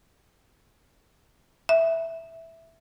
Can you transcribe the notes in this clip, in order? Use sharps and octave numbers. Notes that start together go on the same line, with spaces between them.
E5